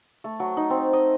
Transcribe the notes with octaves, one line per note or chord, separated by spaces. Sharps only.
A3
F#3
D#4
C4
D#5